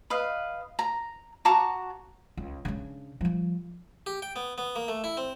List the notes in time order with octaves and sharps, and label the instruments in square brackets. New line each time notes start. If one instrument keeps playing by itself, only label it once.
[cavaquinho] B4 D#5 F5
A#5
F#4 A5 A#5 D6
[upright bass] C#2
C#3 D4
F3 G3
[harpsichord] G4
G5
B3
B3
A#3
A3
E4
C4